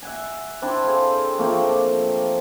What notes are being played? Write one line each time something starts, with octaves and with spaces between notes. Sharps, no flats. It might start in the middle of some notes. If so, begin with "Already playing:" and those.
E5 F#5 G#5
C4 D4 E4 C6
G#4 A4 C5 F5
F3 A3 A#3 C4